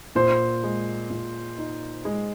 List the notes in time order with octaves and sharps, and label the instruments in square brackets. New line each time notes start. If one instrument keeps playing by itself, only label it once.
[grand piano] A#2 [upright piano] C5
[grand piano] G#3
A#2
D#4
G#3